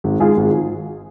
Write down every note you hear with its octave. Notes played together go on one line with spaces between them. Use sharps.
G#1
G#2 G#3 F4 G#4
G#1